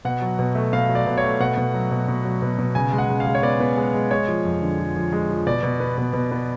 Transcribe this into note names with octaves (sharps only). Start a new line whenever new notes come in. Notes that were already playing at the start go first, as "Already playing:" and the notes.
B2 F#5
F#3
B2
A3
B2 F5
F#3
D5
B2
C#5
A3
B2 F#5
B2
F#3
B2
B2
F#3
B2
B2
C#3 G#5
G#3
F#5
C#3
F5
G#3
C#5
B3 D5
B3
G#3
G#3
G#3 C#5
F3
F2
D3
F3
F3
G#3
F3
B2 D5
B2
B3
B2
B2
B3